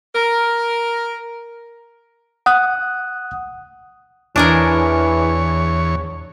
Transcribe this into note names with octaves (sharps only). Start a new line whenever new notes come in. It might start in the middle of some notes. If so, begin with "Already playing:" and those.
A#4
F#5 D#6 F#6
E2 E3 D4 G#4 A#4 C#5